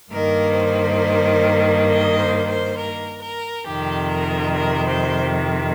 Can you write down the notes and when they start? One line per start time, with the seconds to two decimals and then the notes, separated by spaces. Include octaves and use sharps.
0.11 G2 D#3 A#3 A#4
0.55 C5
1.90 D#5
2.19 C5
2.48 C5
2.79 A#4
3.22 A#4
3.67 F2 C3 D#3 G4
4.11 A#4
4.56 A#4
4.87 C5